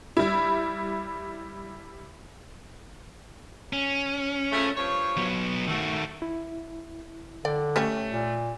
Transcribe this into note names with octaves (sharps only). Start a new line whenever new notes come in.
G3 E4
C#4
C#3 F3 A3
G2 F3 C#5
F#3 B3
D#3 A3 F#4
E4
D3 D5 G5
G3 A3 C#4 C#5
A#2